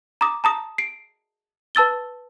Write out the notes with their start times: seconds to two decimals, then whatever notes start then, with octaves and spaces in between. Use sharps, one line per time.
0.21 A#5 D6 D#6
0.44 A5 A#5 D#6
0.78 C7 D7
1.75 B4 A5 E6 A6 G7